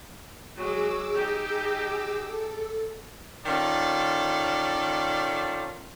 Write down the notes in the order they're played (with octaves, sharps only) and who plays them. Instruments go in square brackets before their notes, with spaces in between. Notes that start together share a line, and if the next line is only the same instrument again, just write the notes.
[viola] F#3 G#3 [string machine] G#4 D6 E6
[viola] D#4 G4
[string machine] A4
[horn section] D#3 C#4 F4 A4 D5